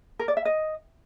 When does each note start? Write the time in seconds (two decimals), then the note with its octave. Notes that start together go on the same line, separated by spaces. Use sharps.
0.19 A#4
0.28 D5
0.37 E5
0.45 D#5